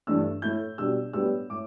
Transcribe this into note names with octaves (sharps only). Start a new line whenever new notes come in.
G2 E3 A3 D4 E6
A2 A3 E4 G6
B2 G3 D4 E6
A2 G3 B3 D4 E6
A2 A3 D6